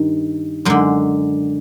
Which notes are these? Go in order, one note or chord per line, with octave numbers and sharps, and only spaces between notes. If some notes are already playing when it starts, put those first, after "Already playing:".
Already playing: G2 D#3
F#2 D3 G#3